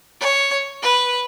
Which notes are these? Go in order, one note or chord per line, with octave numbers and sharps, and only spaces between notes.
C#5
B4